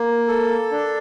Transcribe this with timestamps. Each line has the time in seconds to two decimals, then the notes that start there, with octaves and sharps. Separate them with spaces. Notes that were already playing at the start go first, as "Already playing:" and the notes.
Already playing: A#3
0.28 A4
0.71 D4